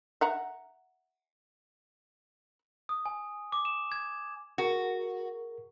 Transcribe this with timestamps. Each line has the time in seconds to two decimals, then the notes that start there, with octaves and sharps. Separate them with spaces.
0.21 E5 F#5 A#5
2.89 D#6
3.06 G#5
3.52 D6
3.65 E7
3.92 G#6
4.58 F#4 G#4 A#4